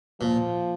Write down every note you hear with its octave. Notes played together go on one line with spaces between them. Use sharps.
A#2 F3